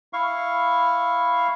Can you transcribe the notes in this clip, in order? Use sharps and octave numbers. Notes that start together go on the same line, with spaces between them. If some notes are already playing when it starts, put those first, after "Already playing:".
E4 F5 C#6